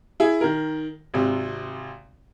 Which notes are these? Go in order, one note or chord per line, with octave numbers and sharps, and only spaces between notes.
E4 G#4
D#3 A#4
G#1 C3